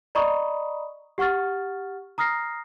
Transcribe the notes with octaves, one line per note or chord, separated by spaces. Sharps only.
D5 D#5 A#5 B5 C#6 D#6
G4 F#5 C#6 F6 A6
A#5 D#6 F6 A#6 C7